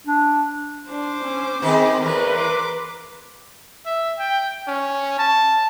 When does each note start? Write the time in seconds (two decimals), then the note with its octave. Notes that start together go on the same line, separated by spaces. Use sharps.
0.07 D4
0.89 D4 C5 D6
1.24 C#4
1.62 D#3 B3 C4 G4 G#4
2.01 E2 E3 A#4 B4
2.33 C6 D6
3.86 E5
4.18 G5
4.68 C#4
5.19 A5